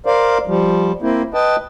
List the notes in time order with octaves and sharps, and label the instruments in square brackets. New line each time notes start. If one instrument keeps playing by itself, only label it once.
[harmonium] A#4 C5 D5 F5
F3 G3
A#3 C4 E4
B4 D#5 G5 A5